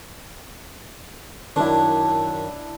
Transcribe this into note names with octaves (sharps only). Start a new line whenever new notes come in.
F#2 D#3 D4 E4